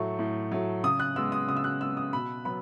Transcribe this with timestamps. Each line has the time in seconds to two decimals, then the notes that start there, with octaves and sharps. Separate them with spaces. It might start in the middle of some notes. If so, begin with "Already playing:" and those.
Already playing: A2 F#3 A3 C#6
0.19 A2
0.52 F#3 A3
0.84 C#3 D#6
1.00 F#6
1.16 G#3 B3 E6
1.32 D#6
1.49 C#3 D#6
1.57 E6
1.64 F#6
1.80 G#3 B3 E6
1.97 D#6
2.13 B2 B5
2.45 F#3 B3 B5